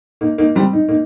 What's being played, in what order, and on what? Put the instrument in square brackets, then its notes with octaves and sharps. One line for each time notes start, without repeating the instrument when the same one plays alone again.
[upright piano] A#3 D#4
A#3 D#4
G3 C4
D#4
A#3 D#4